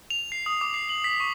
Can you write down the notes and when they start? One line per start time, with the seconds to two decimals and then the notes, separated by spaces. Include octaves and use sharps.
0.10 F7
0.32 C7
0.46 D#6
0.61 D6
0.74 C7
0.89 F#7
1.04 B6
1.20 C#6